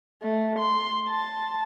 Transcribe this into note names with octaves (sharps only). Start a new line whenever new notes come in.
A3
C6
A5